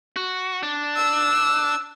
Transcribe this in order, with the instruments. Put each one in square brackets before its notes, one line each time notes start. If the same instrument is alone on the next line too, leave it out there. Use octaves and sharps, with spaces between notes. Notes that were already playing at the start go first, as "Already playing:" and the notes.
[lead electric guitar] F#4
D4
[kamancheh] E6